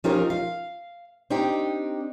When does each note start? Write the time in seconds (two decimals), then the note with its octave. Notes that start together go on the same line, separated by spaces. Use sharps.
0.04 F3 C#4 D#4 F4 G4 A#4
0.30 F5
1.30 C4 D4 D#4 G4 G5